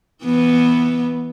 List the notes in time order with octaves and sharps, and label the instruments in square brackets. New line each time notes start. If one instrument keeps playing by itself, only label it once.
[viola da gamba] E3 B3